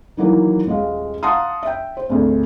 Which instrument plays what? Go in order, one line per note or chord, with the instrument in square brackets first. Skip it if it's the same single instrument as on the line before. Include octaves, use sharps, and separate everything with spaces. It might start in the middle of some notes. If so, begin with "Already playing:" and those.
[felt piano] D#3 E3 F#3 A#3
D#1 G#3 F5
F5 F#5 A5 A#5 C6 D#6
E5 G5
C5
G#1 D2